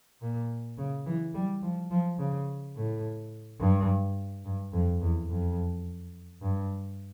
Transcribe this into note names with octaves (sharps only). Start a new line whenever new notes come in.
A#2
C#3
E3
G3
F3
F3
C#3
A2
G2
G2
F2
E2
F2
G2